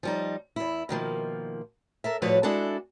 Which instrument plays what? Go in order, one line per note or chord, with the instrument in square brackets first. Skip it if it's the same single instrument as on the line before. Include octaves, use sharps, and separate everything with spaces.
[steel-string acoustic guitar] F3 G3 D#4
E2 E4
B2 D#3 F3 A#3
A4 A#4 E5
A2 F3 G3 F#4 B4 C#5
G#3 D4 E4 F#4 A4